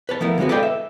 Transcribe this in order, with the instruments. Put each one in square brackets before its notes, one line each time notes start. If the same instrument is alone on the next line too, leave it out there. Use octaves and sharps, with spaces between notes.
[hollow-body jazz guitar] B4 C#5 A5
F3 A3 B3 E4 A#4
D3 G#3 B3 C4 F#4
A4 B4 D5 D#5 F5 G5
E5